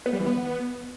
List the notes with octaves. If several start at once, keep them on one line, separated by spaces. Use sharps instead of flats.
B3
G3
E3
B3